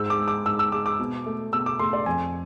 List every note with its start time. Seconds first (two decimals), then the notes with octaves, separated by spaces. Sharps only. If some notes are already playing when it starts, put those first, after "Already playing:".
Already playing: G#2 E6
0.10 D6
0.19 G#3
0.28 D6
0.46 G#2 E6
0.59 E6
0.72 G#3 D6
0.86 D6
0.99 B2
1.26 A3
1.53 B2 E6
1.66 D6
1.79 A3 C6
1.93 D5
2.06 F2 G#5